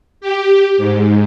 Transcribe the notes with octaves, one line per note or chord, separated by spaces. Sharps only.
G4
G#2